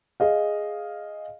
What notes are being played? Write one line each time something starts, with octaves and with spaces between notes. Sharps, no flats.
G#4 D#5 F5